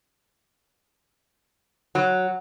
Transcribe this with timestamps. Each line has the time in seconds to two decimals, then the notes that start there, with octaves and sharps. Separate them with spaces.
1.95 F#3